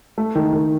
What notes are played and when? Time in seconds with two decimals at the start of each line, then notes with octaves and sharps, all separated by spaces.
0.18 A3
0.35 D#3
0.53 D#3